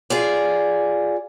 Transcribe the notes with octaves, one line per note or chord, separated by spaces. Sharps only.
F4 G#4 D5